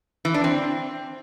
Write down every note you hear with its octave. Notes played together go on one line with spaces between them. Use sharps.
E3
D4
C4